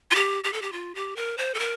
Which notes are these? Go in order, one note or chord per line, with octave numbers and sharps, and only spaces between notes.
F4
G4
G4
A4
G4
F4
G4
A#4
C5
A4
A#4